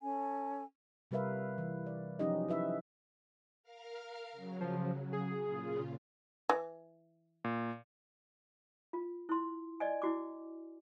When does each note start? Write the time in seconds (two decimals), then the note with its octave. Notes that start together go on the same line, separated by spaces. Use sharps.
0.01 C#4 A4 G#5
1.11 C3 G3 A#4 B4 E5 F5
1.58 E3
1.86 D5
2.19 F3 F#3 C#4 D#4 G4 D#5
2.48 E4 B4 E5
3.63 A#4 F5 F6
4.32 C#3 F#3
4.61 F3
5.13 G#4
5.43 A#2 C#3 F4
6.49 E3
7.44 A#2
8.93 F4
9.29 E4 C6
9.80 D5 D#5 G#5
10.02 E4 F#4 D6